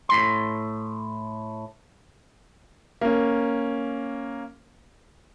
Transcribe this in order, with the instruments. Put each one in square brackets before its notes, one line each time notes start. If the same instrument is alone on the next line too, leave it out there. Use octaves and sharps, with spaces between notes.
[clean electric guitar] A2 C6
[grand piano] A#3 C#4